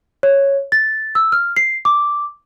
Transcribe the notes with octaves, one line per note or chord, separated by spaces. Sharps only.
C#5
A6
E6
F6
C7
D6